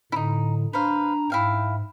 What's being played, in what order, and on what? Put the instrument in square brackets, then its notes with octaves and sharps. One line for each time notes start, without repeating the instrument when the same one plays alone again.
[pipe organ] A2 D3 [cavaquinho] D#4 E4
[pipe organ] D4 A#5 [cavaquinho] B4 C5 F5
[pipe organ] G#2 [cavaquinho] E4 F5 G5